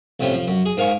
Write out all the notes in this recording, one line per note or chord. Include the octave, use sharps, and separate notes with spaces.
C2 A2 F3 C#4
F3
F#2
G#4
G#2 A#3 F5 G#5 C#6